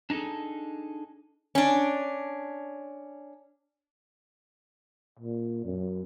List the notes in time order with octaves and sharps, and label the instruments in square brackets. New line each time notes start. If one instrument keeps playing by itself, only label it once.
[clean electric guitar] D4 D#4 G#4 A4
[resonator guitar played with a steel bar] C#4 D4
[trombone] A#2
F#2